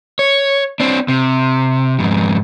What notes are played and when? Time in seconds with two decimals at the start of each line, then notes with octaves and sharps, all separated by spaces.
0.19 C#5
0.80 C4 D4
1.08 C3
1.99 F2 G#2